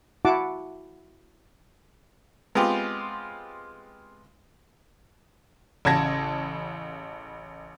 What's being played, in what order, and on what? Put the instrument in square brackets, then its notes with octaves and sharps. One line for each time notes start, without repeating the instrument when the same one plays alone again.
[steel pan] E4 F#4 F#5 A5 D6
[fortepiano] G#3 B3 C4 F4 G4
[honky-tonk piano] A1 C#3 A5 G#6 A#6